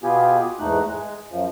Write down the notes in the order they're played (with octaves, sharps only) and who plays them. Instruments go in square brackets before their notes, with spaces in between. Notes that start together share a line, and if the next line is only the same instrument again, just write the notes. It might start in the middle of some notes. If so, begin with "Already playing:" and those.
[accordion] B2 B3 F4 G4 G#4
E2 G#2 A3 D#4 F#6
G#3
F#2 F3